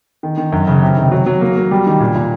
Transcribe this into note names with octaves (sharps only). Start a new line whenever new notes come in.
D#3
D#3
F#2
C#3
C3
D#3
F#3
F#3
A#3
A#3
G3
D#3
A#2
A#2